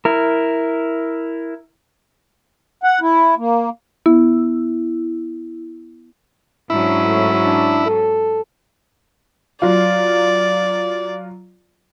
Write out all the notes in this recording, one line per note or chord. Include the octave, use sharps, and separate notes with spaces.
E4 A#4
F#5
E4
A#3
B3 E4
G#2 F#3 C#4 D4 E4
A2
D4
A4
F#3 F4 D5